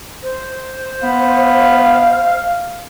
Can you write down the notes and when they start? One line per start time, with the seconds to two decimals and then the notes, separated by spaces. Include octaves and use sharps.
0.23 C5
1.03 B3 F5